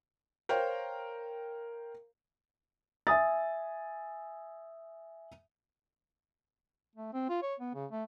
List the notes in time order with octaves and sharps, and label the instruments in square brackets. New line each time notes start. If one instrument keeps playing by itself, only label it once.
[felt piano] A#4 C5 C#5 F5 G5 A#5
E5 G#5 D#6 A6
[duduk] A3
C4
F4
C#5
B3
C#3
A3